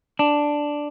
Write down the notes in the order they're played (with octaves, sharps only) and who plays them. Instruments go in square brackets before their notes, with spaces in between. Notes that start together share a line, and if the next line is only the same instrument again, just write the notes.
[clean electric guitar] D4